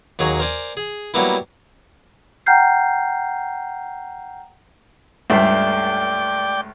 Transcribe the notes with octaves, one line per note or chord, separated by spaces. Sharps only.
D#2 F#3 G#4 G#5 A#5 C#6
A#4 C5 D5 G#5
G#4
F#3 G3 A#3 B3 E4
F#5 G5 A#5 F6 G6 C7
C#2 G2 A3 D5 G5